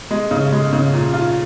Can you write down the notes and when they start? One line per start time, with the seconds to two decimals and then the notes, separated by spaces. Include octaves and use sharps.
0.11 G#3
0.31 C#3
0.52 G#3
0.73 C#3
0.93 A#2
1.14 F4